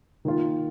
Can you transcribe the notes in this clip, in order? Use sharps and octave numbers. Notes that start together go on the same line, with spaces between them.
D#3 A#3 F4